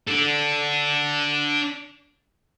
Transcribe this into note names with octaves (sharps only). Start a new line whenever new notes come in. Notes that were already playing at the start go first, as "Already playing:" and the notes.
D4 A4